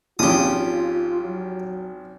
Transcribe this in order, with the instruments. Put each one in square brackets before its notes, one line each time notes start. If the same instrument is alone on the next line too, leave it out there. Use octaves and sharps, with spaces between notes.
[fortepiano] G#1 F3 C#4 [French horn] F4 [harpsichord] G4 D#6
[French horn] F#3